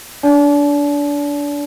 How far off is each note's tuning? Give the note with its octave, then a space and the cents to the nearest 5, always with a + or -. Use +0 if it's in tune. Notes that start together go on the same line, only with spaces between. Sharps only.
D4 -20 D5 -35 A5 -40